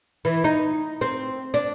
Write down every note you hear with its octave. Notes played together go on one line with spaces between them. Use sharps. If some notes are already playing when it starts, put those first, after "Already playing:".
E3
D#4
C4
D4